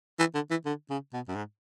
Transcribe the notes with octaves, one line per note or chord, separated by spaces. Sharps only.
E3
D3
E3
D3
C#3
B2
F#2
G#2